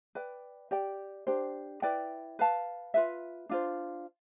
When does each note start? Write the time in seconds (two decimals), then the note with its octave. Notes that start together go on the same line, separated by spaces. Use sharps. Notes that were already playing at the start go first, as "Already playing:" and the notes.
0.15 B4 D5 G5
0.71 G4 D5 G5
1.27 D4 G4 C5
1.82 E4 B4 D5 G5
2.39 B4 F5 A5
2.94 F4 B4 E5
3.49 D4 F4 C5